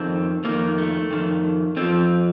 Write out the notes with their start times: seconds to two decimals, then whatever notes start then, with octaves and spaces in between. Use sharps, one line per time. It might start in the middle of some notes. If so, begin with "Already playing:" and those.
Already playing: F2 D#3 C4
0.44 F2 D#3 A#3
0.78 A3
1.11 F2 D#3
1.76 F2 D3 F3 C4